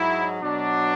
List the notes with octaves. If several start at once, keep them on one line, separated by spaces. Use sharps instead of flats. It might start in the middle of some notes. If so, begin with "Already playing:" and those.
Already playing: G#2 F#3 E4
B2 F#3 D4